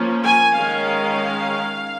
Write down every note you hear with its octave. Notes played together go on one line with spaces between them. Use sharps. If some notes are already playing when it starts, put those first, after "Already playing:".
Already playing: F3 A#3 C#4
G#5
D#3 G#3 C#4 F5